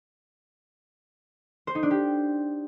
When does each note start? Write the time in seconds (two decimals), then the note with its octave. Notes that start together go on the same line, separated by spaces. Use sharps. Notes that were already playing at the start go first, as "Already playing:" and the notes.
1.67 C5
1.75 D#4
1.83 D4
1.90 G4